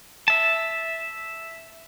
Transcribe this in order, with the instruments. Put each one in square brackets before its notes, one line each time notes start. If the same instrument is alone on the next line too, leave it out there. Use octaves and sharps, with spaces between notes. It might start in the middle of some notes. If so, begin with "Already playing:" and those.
[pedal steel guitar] E5 A5